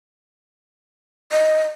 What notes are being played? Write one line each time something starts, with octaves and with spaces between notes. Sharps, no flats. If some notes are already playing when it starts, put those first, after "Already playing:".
D#5